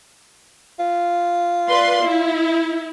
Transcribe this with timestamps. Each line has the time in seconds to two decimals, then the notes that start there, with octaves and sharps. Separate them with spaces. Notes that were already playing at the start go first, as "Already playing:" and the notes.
0.79 F4
1.69 B4 D5 C6
2.03 E4